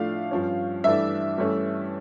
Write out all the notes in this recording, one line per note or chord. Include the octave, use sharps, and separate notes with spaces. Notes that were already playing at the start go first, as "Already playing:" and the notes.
Already playing: A2 F3 A3 D4 F5
G2 F3 C#4
G2 E3 A3 D4 E5
G2 E3 A3 C#4